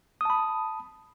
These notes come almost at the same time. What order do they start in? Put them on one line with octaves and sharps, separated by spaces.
D#6 A5 B5